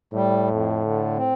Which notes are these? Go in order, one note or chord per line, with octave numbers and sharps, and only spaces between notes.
A2 G3
F2
D3
C4